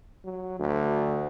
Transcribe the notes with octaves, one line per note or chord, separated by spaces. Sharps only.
F#3
D2